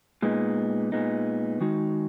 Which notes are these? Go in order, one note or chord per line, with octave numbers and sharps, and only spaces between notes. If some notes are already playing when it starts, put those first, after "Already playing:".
A#2 G#3 B3 D#4
A#2 G#3 B3 D#4
D#3 G#3 D#4 F#4